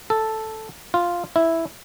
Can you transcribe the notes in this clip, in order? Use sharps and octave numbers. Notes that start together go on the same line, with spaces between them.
A4
F4
E4